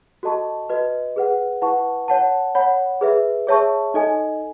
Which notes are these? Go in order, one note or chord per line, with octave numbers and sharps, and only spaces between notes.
F#4 A4 D#5 A5 C#6
F#4 B4 D#5
G#4 B4 F#5
E4 B4 F#5 A5 C#6
C#5 F#5 A5
C#5 F#5 B5
G#4 B4 E5
G#4 C#5 E5 A5 C#6
D#4 A4 D#5 G#5